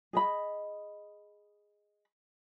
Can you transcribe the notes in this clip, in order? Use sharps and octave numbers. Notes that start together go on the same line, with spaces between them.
G#4 D#5 B5